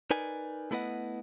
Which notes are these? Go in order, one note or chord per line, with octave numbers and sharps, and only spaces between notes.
D#4 A#4 B4 D5 G#5
A3 B3 E4 B4 D#5 F#5